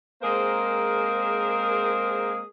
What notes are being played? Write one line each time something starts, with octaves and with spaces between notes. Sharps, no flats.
G#3 A#3 C4 G#4 A#4 C5